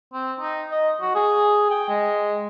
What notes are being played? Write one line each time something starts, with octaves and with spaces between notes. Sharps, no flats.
C4
D#4
D#5
F#4
G#4
G5
G#3